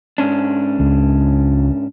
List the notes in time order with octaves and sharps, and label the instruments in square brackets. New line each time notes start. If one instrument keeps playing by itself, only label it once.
[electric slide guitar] G#2 C#4 D4
[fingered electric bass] C#2